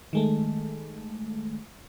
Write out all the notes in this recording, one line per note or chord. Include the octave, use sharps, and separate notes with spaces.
D#3 G#3 A3